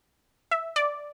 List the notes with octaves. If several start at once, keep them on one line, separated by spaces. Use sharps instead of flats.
E5
D5